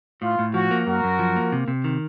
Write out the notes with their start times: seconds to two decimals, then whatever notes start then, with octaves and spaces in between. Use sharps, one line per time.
0.22 A2 F4
0.39 A2
0.54 F3 F#4
0.71 A#3
0.87 F#2 F#4 A#4
1.04 F#2
1.19 F3
1.36 A#3
1.52 C3
1.68 C3
1.84 D#3